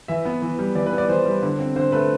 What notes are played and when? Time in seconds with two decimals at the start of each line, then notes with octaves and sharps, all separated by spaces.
0.08 E3 E5
0.25 B3
0.42 E3
0.59 G3
0.75 E3 D5
0.86 B4
0.93 B3
0.98 D5
1.09 E3 C5
1.25 G3
1.42 D3
1.59 C4
1.76 D3 C5
1.92 A3 B4